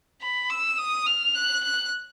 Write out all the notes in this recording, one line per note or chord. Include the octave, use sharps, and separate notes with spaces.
B5
E6
D#6
F6
F#6
F#6